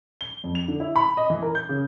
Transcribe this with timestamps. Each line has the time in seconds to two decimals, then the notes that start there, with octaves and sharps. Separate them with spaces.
0.21 G7
0.44 F2
0.55 F7
0.68 D3
0.80 E4
0.96 B5
1.17 D#5
1.30 E3
1.42 A#4
1.55 G6
1.69 C#3